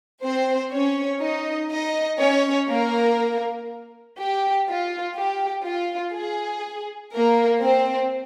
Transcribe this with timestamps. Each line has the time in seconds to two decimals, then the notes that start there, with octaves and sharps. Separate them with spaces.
0.23 C4 C5
0.72 C#4 C#5
1.21 D#4 D#5
1.70 D#4 D#5
2.20 C#4 C#5
2.69 A#3 A#4
4.17 G4
4.66 F4
5.15 G4
5.65 F4
6.13 G#4
7.12 A#3 A#4
7.61 C4 C5